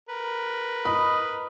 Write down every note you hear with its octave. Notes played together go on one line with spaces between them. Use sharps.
A#4 B4
D#5 B5